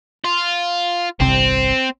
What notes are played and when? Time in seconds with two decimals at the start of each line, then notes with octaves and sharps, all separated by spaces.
0.24 F4
1.20 G1 C2 C3 C4